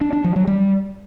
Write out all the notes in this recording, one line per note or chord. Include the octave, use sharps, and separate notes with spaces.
D4
D4
F3
F#3
G3